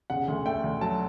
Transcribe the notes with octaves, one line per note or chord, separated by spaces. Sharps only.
C#3 F#5
D2
A3 G5
D2
F#3 A5